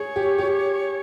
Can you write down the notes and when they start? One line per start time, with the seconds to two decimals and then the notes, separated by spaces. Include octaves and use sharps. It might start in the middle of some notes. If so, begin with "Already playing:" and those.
Already playing: G#4 C#5
0.16 G4
0.38 G4